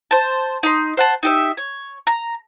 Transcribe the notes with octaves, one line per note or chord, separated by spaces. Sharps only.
C5 A5
D#4 C6
C5 F#5 A5
D#4 G4 E5
C#5
A#5